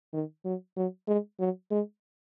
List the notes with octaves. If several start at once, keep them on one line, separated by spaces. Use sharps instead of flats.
D#3
F#3
F#3
G#3
F#3
G#3